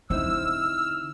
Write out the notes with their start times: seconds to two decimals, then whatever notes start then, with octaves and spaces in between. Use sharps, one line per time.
0.10 D3 C4 D#4 E4 E6 F6